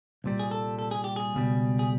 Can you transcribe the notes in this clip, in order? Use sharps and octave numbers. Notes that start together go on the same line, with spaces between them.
C2 A#2 G3
G#4
A4
A4
G#4
G4
G#4
C#2 B2 G3
G#4